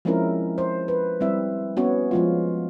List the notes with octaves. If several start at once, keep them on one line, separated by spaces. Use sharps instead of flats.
F3 G#3 C4 C#4 E4 A#4
C5
B4
G3 C4 E4 E5
B3 C#4 F#4 C#5
F3 G#3 F4